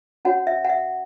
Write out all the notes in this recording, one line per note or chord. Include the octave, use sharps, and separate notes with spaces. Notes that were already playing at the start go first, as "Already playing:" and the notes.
C#4 F#4 C#5 F#5
E5
F#5
E5